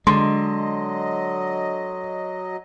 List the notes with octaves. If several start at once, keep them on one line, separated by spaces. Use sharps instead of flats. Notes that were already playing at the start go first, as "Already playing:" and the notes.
D3 F#3 G#3 D#5 C6